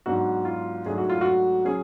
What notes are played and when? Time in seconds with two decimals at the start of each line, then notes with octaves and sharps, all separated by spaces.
0.06 G#2 F#3 B3 D4 F#4
0.45 F4
0.86 G#2 F#3 A3 D4 G#4
0.98 F#4
1.10 F4
1.21 F#4
1.65 F#3 C#4 G#4